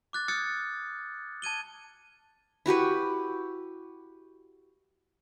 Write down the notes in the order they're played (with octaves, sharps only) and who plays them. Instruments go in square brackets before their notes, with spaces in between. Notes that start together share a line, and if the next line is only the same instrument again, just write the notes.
[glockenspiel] D6 F#6 A6
D#6 F6 F#6 G#6 A6 C#7
A5 G#6 D#7 G7
[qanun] E4 F#4 G4 B4